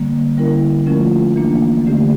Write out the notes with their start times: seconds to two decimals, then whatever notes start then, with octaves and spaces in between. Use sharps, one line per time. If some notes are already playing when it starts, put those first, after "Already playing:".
Already playing: D3 G3 A#3
0.37 D3 G3 C#4 E4 A#4
0.87 F3 A3 C#4 F4 A#4
1.36 E3 A#3 D4
1.87 D3 A3 C#4 G4